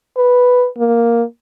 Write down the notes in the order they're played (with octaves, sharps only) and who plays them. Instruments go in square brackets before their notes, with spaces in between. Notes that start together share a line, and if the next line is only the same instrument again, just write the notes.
[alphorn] B4
A#3